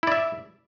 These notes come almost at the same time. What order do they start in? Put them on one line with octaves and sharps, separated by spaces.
E4 D5 E5